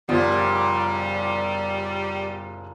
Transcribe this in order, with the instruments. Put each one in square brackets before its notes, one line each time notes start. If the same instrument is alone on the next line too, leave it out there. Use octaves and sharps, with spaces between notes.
[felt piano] F#1 F3 [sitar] A#2 [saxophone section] G3 [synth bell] B3 F4 C5